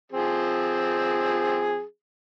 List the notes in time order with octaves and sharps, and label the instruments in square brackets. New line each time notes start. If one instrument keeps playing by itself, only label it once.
[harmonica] F3 C4 G#4